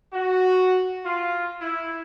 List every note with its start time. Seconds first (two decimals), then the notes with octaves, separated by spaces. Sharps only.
0.13 F#4
1.05 F4
1.59 E4